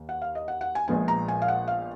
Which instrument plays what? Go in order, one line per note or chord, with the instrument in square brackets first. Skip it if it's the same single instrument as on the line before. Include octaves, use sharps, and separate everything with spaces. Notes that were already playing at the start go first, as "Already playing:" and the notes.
Already playing: [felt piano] D#2
F#5
F5
D#5
F#5
F#5
G#5
A#1 A#2 F3 G#3 B3 G#5
A#5
G#5
F5
F#5
F5